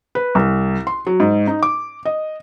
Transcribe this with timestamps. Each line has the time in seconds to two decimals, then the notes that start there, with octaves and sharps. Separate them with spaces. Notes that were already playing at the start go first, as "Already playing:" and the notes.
0.15 B4
0.35 C2
0.87 C6
1.07 F#3
1.20 G#2
1.47 D#4
1.63 D6
2.05 D#5